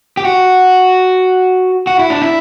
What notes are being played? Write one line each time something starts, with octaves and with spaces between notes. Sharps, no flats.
G4
F#4
F#4
E4
D4
E4